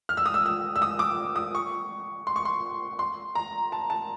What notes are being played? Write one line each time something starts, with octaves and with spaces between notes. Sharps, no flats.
F6
E6
D#6
E6
E6
E6
D#6
D6
D#6
C#6
C6
C#6
C6
C6
A#5
A5
A5